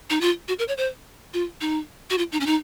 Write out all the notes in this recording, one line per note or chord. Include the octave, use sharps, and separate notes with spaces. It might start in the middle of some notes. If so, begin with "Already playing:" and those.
D#4
F4
F#4
A#4
C#5
C5
F4
D#4
F#4
F4
D#4
C#4
D#4